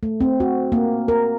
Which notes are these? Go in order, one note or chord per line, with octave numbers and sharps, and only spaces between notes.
A3
C4
F#4
A#3
A#4